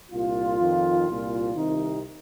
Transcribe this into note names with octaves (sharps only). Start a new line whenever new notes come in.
C2 A#2 F4
F2 D#3
C2 A#2
C2 C3 D#3 D#4